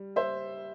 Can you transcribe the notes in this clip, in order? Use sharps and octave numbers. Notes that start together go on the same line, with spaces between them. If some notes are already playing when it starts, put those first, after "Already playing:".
Already playing: G3
C5 E5